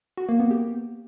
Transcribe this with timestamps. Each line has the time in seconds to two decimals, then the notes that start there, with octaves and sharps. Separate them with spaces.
0.18 F#4
0.29 A#3
0.40 B3
0.51 G4